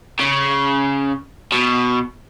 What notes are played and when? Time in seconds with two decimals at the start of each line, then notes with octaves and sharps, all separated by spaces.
0.20 C#3
1.52 B2